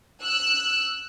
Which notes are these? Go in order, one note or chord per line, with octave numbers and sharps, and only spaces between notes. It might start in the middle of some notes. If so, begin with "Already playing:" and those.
E6 F#6